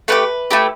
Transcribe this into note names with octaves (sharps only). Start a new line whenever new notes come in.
A3 E4 G4 B4
A3 E4 G4